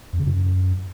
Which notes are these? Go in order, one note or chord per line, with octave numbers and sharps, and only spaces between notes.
F2
C#3
F#2